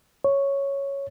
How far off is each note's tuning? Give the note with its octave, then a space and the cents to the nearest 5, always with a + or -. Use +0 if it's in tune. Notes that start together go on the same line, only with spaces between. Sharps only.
C#5 +0